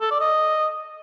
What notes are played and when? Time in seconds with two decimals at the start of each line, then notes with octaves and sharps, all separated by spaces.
0.01 A4
0.11 D5
0.20 D#5